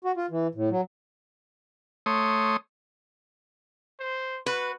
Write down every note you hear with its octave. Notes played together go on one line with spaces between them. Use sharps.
F#4
F4
E3
A2
F#3
A3 C#5 C6 D#6
C5
F#4 B4